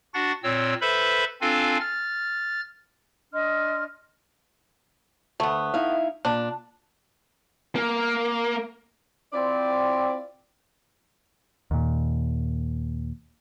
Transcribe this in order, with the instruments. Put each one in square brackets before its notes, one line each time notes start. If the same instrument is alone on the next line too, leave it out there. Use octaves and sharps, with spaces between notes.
[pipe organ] D4 F#4 F#5 A6 A#6
A#2 C4 C#5 E6
A4 B4 C5 E5 B5
C4 D4 F4 A4 F5 G#5
F6 A6
[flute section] D4 D#5 C6 F6
[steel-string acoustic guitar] D2 [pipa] A3 B3
[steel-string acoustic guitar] D#4 E4 F5
[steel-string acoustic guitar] A#2 [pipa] D4
[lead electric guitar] A#3
[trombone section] C4 [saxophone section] E4 F4 D5
[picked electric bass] D#2 A#2